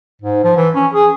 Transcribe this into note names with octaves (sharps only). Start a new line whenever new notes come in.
G#2
F3
E3
C#4
G#4